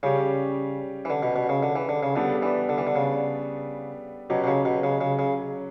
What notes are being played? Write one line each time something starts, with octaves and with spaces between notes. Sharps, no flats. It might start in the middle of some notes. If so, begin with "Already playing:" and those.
C#3 G3 C#4 G4
E3
D3
B2
B2
C#3
D3
E3
D3
C#3
D3 G3 B3 D4 A4
E3
D3
E3
D3
C#3
B2 F#3 C#4 G4
B2
C#3
B2
C#3
C#3
C#3